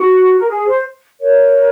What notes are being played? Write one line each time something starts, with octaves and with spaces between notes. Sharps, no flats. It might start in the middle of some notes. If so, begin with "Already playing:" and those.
Already playing: F#4
A#4
G#4
C5
A#4 C#5